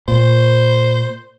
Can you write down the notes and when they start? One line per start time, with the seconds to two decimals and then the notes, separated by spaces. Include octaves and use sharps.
0.08 A#2 C5